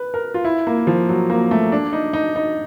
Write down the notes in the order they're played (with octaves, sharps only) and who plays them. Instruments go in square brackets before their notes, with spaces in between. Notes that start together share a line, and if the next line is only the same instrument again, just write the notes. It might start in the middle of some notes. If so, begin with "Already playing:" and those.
Already playing: [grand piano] B4
A#4
F4
E4
A#3
F3
F#3
A#3
A3
D4
D#4
D#4
D#4